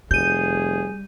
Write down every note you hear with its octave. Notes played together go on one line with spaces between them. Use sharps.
F1 G3 G#4 G6 D#7